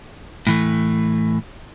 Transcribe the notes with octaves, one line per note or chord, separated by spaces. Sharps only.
A2 E3 A3